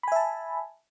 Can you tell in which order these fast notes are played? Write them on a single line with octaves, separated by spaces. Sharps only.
B5 G#5 E5 A5